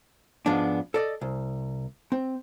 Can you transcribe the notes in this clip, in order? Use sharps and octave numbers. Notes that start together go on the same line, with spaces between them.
G#2 F3 G#3 B3 D4
A4 D5 D#5
C2
C4